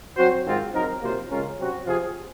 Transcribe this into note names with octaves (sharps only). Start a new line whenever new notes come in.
F#3 C4 F#4 C5
G#2 D#3 G#3 C4 F4
F#3 C4 D#4 A#4
C3 F#3 A#3 F4 C5
C#3 G#3 C#4 F4 A#4
C3 F#3 C4 F#4
C3 F3 C4 F4 G#4